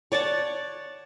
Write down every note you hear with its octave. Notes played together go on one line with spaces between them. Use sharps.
C#5 D5 F#5 A5